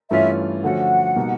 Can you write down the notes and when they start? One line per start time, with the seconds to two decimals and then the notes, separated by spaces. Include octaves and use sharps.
0.10 G2 E3 A3 C#4 F4 E5
0.63 D3 F3 A3 C#4 F#4 F#5
1.16 B2 G3 A#3 D#4 F#4